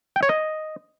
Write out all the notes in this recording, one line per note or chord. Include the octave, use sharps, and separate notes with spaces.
G5
C#5
D#5